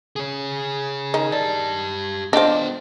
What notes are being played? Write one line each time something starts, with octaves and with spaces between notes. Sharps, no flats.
G#4 C#5
D#3 D#4
G4 D5 A5
B3 D4 F4 C5 D#5 G5